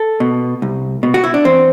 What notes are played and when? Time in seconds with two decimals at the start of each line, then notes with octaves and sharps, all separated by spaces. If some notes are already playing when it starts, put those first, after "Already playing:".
Already playing: A4
0.20 B2
0.62 C2
1.03 B2
1.14 F#4
1.24 E4
1.34 D4
1.45 E2 C4